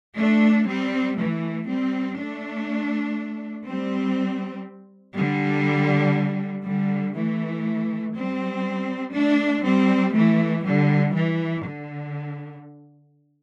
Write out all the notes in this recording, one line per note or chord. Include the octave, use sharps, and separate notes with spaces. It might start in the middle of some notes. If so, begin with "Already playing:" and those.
A3 D4
G3 C4
E3 A3
G3 C4
A3 D4
G3 C4
D3 G3
D3 G3
E3 A3
G3 C4
A3 D4
G3 C4
E3 A3
D3 G3
E3
D3